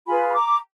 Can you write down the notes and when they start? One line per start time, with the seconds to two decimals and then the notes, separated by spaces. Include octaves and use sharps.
0.06 F4 G#4 B4 G#5 B5
0.28 B5
0.33 A#5 D6